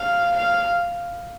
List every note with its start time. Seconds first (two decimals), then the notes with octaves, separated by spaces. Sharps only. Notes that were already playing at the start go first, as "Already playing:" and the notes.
Already playing: F5
0.37 F5